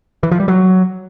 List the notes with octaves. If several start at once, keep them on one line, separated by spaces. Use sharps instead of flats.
E3
F3
G3
F#3